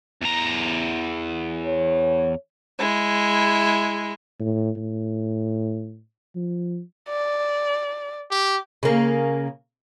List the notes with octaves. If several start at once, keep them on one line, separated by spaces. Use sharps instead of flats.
E2 A#5
C#5
G#3 E4
A2
A2
F3
D5
G4
C#3 A#3